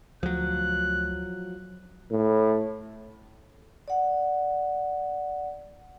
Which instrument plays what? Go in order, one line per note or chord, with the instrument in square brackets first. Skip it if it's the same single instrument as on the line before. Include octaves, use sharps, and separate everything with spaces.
[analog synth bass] D2 [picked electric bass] F3 F#3 [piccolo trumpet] F#6
[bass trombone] A2
[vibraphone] D5 F#5